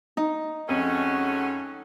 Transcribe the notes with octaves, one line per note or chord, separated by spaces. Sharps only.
D#4
F2 G#3 A3 C#4 F#4